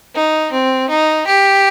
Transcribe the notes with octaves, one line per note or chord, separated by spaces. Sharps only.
D#4
C4
D#4
G4